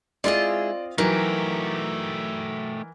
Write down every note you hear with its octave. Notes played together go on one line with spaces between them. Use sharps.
G#3 C4 E4 F4 G#4 D5 D#5
E3 F#3 A3 D#4 G4 A#4